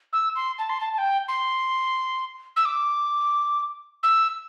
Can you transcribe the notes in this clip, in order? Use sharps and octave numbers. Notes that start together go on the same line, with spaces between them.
E6
C6
A5
C6
A5
A5
G5
C6
E6
D6
E6